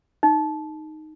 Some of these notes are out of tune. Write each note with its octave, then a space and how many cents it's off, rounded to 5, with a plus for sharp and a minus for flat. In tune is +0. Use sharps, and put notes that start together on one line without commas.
D#4 -5